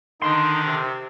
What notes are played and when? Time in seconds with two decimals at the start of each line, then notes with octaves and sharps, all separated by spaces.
0.22 D3 D#3 D4 D#4 C6
0.65 C3